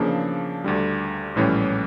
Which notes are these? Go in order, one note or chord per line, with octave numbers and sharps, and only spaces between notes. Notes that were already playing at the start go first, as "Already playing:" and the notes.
Already playing: E2 C#3 F3 A#3 D4
D2 D3 G3
A#1 A2 E3 G3 C#4